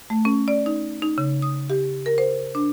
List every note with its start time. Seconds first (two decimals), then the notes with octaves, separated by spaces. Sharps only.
0.10 A3
0.25 C#4
0.48 D5
0.66 D#4
1.02 D#4
1.18 C#3
1.42 D#6
1.70 G4
2.06 A#4
2.18 C5
2.55 D4